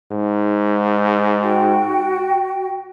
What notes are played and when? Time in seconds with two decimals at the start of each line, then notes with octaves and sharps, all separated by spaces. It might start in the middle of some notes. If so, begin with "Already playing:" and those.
0.11 G#2
1.41 F#4 G5